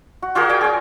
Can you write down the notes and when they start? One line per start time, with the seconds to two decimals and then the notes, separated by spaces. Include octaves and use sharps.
0.22 F#4
0.35 F4 F#4 G#4 A#4
0.49 D5 G5 G#5
0.61 C#4 G#4